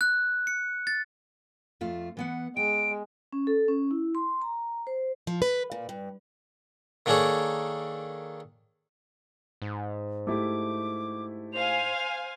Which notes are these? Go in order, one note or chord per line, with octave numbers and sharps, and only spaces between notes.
F#6
C#7
A6
F2 A3 F4
E3 B3 F#5
G#3 G5 D7
C#4
A4
C#4
E4
C6
A#5
C5
F3
B4
A#2
G2
D#3 A#3 D4 G#4 A4 C#5
G#2
A3 E4 G4 D6
C5 F5 G#5 F7